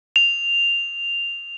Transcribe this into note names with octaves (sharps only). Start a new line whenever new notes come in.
F7